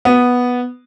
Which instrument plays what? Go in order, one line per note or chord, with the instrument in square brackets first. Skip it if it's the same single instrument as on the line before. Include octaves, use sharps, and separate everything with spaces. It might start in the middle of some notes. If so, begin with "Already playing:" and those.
[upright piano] B3